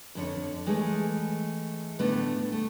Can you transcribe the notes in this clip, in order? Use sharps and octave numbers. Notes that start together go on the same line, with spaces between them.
F2 D3 C#5
E3 G#3 A3 G4 G#4
A2 D3 A3 B3 D4
A3